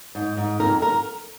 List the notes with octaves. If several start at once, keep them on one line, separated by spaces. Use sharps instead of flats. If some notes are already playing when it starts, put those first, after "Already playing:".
G#2
G#2
F2 A#4
A#4